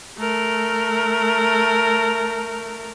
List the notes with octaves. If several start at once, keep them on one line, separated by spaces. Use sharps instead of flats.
A3 A#4